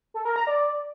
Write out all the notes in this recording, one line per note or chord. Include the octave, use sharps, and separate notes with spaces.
A4
A#4
A#5
D5